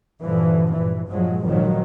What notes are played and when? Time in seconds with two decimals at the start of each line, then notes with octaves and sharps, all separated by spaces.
0.22 G2 A#2 D3 E3 F3
0.72 G#1 G2 A#2 E3
1.07 G2 A#2 F3 F#3 G#3
1.44 G#1 G2 A#2 D#3 F3 F#3